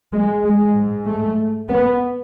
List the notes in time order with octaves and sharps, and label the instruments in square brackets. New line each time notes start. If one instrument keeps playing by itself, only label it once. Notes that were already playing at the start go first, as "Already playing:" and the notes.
[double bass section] G#3
G#3
G#2
A3
B3